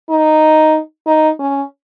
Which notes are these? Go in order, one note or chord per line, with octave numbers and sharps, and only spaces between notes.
D#4
D#4
C#4